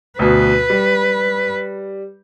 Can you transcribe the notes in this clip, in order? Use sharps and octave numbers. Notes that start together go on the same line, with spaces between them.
D2 B2 B4
G3